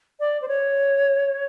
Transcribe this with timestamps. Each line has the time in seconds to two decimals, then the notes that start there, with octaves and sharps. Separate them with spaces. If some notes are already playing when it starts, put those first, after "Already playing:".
0.20 D5
0.42 C5
0.48 C#5